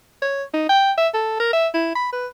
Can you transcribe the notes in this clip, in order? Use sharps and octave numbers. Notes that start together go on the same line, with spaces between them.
C#5
D#4
G5
E5
A4
A#4
E5
E4
B5
B4